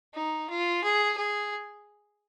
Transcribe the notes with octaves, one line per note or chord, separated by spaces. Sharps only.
D#4
F4
G#4
G#4